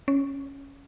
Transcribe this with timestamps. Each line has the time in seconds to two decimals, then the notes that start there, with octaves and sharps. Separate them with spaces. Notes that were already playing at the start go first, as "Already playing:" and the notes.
0.08 C#4